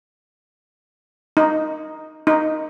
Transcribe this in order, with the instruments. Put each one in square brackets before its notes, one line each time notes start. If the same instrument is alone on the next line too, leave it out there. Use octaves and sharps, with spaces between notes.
[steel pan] D#4
D#4